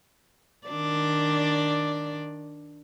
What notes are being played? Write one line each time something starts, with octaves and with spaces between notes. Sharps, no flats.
D#3 D4 D5